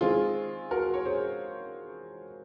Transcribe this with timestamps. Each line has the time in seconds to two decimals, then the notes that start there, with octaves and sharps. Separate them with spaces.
0.01 D#3 G#3 C4 F4 G#4
0.71 F#4 A#4
0.94 C#5
1.05 G#4 C5